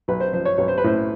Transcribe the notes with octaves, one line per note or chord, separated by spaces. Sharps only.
B1 B4
C5
F3 C5
C#5
B1 C#5
C5
B4
A2 C5